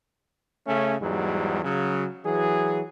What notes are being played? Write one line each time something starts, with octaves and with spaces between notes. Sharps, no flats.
C#3 A3 C#4
E2 G#2 F#3 G3
C#3 F#3
E3 F#3 G#4